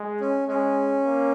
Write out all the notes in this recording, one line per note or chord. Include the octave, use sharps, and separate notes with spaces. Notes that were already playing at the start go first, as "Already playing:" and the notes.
Already playing: G#3
C#4
G#3 C#4
A#3